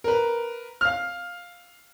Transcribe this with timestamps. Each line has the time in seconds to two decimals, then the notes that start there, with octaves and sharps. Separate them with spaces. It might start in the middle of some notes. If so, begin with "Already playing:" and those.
0.04 A#4 B4
0.81 F5 F6